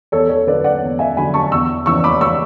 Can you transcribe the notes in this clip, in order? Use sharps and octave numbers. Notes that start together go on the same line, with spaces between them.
E2 A4 C#5
A4 C#5
D3 F#3 B4 D5
D5 F#5
E2
E5 G#5
D3 F#3 G#5 B5
A5 C#6
E2 C#6 E6
C#3 E3 C#6 E6
B5 D6
C#6 E6